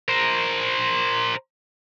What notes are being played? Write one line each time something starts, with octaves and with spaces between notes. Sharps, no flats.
A#4 C5